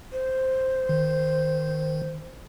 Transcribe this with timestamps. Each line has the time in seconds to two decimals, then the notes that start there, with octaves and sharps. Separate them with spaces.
0.12 C5
0.89 D#3